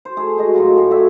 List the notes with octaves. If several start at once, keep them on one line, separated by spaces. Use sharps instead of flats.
C5
A3 G#4
G#3 F#4 D#5
A2 F#3 F4
A2 D3
F#4 E5 G#5